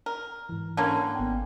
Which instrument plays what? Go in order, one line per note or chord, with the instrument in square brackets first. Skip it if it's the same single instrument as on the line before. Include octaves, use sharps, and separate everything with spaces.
[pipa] A#4
[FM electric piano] G#2 E3
[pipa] D3 A#3 C#4
[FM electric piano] G#1 B3 G5